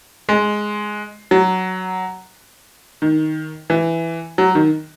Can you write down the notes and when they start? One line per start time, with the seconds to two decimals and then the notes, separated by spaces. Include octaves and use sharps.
0.29 G#3
1.31 F#3
3.02 D#3
3.70 E3
4.38 F#3
4.55 D#3